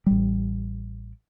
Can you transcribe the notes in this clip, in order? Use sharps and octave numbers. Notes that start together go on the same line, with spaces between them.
A1 G3